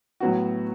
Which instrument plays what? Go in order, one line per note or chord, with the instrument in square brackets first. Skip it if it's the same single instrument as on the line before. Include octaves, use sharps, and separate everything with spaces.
[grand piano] A2 F#3 B3 F#4